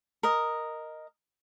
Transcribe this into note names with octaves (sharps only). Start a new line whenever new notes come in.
A#4 D#5